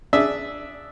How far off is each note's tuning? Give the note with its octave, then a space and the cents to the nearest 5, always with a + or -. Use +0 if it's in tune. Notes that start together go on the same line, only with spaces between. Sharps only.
D4 +0 G#4 +0 E5 +0